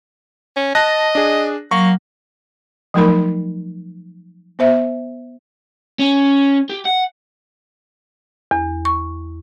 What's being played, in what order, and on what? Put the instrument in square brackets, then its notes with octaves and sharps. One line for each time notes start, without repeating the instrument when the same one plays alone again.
[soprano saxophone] C#4
[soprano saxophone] D#5 [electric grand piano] A5 F#6 A#6
[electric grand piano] D4 G#4
[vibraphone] F#3 [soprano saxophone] A#3 [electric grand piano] C#6
[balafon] F3 F#3 A3 D#4 A#4 B5
B3 C5 E5
[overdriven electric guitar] C#4
G4
F#5
[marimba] E2
C#6